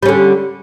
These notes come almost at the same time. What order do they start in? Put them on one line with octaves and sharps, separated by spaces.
G3 C#4 D3